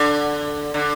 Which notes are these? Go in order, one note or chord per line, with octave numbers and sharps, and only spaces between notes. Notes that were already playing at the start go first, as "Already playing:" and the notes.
Already playing: D3
D3